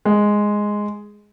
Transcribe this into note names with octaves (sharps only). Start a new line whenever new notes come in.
G#3